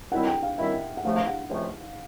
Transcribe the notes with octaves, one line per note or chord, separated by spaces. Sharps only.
F#2 D#3 G3 C4 E4 F#5
G5
F5
F#2 D#3 G3 C4 E4 E5
F#5
C#2 C3 F3 A3 F5
F5
F#5
C#2 C3 F3 A3